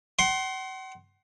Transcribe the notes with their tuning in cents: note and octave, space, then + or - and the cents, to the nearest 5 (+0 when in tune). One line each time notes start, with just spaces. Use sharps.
F#5 +40 C6 +15